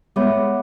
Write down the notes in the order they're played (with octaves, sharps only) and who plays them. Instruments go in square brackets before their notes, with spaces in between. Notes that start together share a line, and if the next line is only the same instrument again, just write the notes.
[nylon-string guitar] G#3 B3 [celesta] C#5 E5 B5 D6